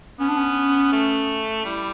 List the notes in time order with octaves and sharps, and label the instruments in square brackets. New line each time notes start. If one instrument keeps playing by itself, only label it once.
[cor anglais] B3 [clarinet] C#4
[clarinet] D4
C#4
[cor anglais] A3
[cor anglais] G3 [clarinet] E4